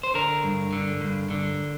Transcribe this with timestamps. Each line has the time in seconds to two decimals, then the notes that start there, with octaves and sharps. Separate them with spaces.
0.03 C5
0.14 D3 A#4
0.44 G2
0.73 D3
1.01 G2
1.31 D3